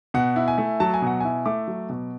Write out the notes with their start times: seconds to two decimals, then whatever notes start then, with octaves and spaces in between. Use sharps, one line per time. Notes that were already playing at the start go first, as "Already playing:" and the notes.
0.14 B2 F#5
0.36 E4
0.48 G#5
0.58 A3
0.80 F#3 A5
0.94 G#5
1.02 B2 F#5
1.20 E4 G#5
1.46 A3 D6
1.68 F#3
1.89 B2